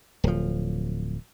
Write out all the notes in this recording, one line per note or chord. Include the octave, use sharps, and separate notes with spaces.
D1 F3